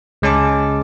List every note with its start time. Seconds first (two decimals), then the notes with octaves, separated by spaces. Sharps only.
0.22 C#2 G#3 C#4 A5 D6